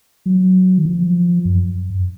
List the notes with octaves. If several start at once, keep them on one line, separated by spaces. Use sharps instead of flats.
F#3
D#3
F3
F#2